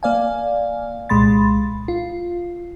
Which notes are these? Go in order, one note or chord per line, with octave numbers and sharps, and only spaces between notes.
A#3 D5 F5 G#5
C2 A#2 G#3 B5 C6 A6
F4